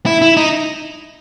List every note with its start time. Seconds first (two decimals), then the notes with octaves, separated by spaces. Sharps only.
0.06 E4
0.22 E4
0.37 D#4